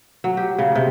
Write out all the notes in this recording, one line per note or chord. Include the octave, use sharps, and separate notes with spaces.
F#3
G4
C#3
C3